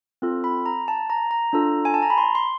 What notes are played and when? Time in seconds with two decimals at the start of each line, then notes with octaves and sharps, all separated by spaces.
0.22 C4 F4 A4
0.44 B5
0.66 A#5
0.88 A5
1.10 A#5
1.31 A#5
1.53 D4 F4 A4
1.85 G#5
1.94 A5
2.02 A#5
2.10 B5
2.18 C6
2.35 C6